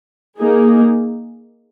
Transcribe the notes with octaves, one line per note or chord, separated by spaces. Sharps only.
A#3 D#4 G#4